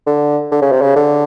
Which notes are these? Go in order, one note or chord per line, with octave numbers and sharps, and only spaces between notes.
D3
D3
C#3
C3
C#3
D3